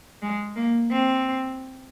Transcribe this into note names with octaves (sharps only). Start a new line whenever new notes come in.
G#3
A#3
C4